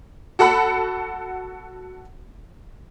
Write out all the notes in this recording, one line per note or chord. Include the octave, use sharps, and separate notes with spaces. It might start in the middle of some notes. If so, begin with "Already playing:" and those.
F#4 A4 F#5 B5